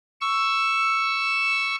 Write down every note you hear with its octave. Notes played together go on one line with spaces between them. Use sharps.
C#6 E6